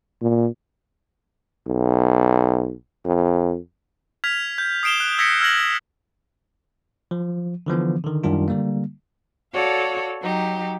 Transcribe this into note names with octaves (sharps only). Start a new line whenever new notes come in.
A#2
B1
F2
F6 G#6 B6 F7
G6
D#6 C7 D7 E7 G7
F#6
E6 G#6 A#6 B6 C#7 D7
E6 F6 G#6 A#6 F#7
F3
D3 E3 F3 B3
D3 D#3
F#2 D#3 G3 D4 F4
D3 G3 A#3
F#4 A4 C#5 D5 F5
F#3 D#4 G4